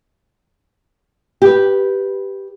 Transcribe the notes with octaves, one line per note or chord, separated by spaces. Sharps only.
G4 B4